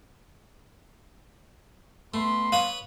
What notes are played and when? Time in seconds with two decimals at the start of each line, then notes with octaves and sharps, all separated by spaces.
2.14 A3 B3 B5 C6
2.52 B4 C#5 F5 D#6